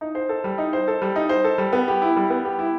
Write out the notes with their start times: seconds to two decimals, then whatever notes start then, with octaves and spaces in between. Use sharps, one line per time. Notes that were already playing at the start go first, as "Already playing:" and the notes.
0.01 D#4
0.15 C5
0.29 A4
0.44 G3
0.58 D#4
0.73 C5
0.88 A4
1.02 G3
1.16 D#4
1.29 C5
1.44 A4
1.58 G3
1.73 B3
1.88 G4
2.02 E4
2.16 G3
2.30 B3
2.45 G4
2.59 E4